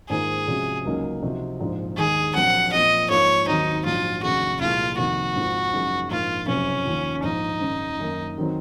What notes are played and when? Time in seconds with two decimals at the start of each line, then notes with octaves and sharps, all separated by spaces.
0.09 G#2 D#3 A#3 F4 G#4 C5
0.47 C3 F3 G#3 C#4 F#4
0.85 C#2 C#3 F#3 A#3 D#4
1.22 C3 F3 C4 D#4 F#4
1.60 A#1 G#2 F3
1.97 D#2 D#3 G#3 G#4
2.35 A#1 A#2 F#3 C4 F#5
2.73 A#2 F3 C4 D#5
3.10 G#2 F3 A#3 F4 A#4 C#5
3.48 D#2 D#3 F#3 C4 D#4 F#4
3.85 A#1 G#2 F#3 F4
4.22 F1 D#2 C#3 G#3 F#4
4.60 C2 A#2 F3 G#3 F4
4.97 F2 C3 D#3 A#3 F#4
5.36 G#1 G#2 F3 C4 F4
5.73 F#1 F#2 F3 G#3 D#4
6.10 A#1 G#2 F3 A#3 F4
6.48 F#1 F2 C3 F#3 C#4
6.85 D#2 C#3 F3
7.23 A#1 G#2 F3 D#4
7.61 G#1 F#2 C#3
7.99 F#2 D#3 A#3
8.38 D#3 F#3 C4